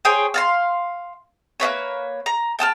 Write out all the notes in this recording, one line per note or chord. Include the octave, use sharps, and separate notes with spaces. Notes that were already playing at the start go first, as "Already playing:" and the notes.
G#4 C5 C#5 G5
F5 A5 C6
A#3 D4 B4 C#5
A#5
G5 A5 E6 F6